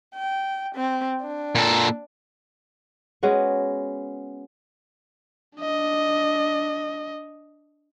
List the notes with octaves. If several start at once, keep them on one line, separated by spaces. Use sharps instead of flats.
G5
C4
D4
A#2 A4
G#3 B3 C#4 F#4
D4 D#5